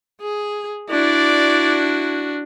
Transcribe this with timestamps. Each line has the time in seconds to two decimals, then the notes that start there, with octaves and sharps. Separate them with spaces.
0.21 G#4
0.90 D4 E4 F#4 D5